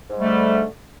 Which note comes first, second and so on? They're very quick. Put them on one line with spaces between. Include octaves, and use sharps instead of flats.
G#2 G3 A3 D3